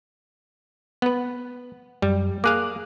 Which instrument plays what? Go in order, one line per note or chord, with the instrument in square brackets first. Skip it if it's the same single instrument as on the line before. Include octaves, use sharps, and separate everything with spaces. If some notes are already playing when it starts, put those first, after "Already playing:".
[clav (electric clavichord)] B3 B4
[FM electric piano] F#2 [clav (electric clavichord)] G3
[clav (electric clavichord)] A#3 G#4 F5 [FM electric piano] D6 F#6